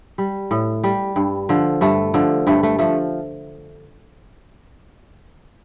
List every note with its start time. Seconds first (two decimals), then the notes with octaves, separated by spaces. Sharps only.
0.18 G3
0.51 A2
0.84 G3
1.16 G2
1.49 D3 F3
1.81 G2 A3
2.14 D3 F3
2.47 G2 A3
2.63 A3
2.79 F3 A3